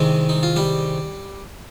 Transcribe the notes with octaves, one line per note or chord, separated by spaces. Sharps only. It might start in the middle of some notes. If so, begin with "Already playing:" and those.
Already playing: C2 C3 D#3 G#3 C4
D#4
F4
G3 G4